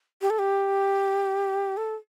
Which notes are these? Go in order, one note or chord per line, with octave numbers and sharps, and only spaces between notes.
G4
A4
G4
A4